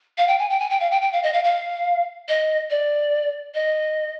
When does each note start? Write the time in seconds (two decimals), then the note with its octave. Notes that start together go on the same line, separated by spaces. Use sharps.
0.18 F5
0.28 G5
0.39 G#5
0.50 G5
0.60 G#5
0.70 G5
0.80 F5
0.91 G5
1.02 G5
1.13 F5
1.23 D#5
1.33 F5
1.44 F5
2.29 D#5
2.70 D5
3.55 D#5